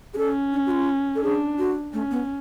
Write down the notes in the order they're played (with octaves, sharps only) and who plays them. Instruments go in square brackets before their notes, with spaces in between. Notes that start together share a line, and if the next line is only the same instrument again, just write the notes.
[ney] G#4
[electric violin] C#4 [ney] A4
[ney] D4
F#4
F4
A4
[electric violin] D4 [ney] G#4
[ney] F#4
[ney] A3 [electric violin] C#4
[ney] B3